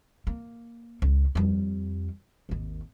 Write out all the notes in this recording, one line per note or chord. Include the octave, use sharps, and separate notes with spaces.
A#3
C#2 C#4
F2 G3
G#1 D#2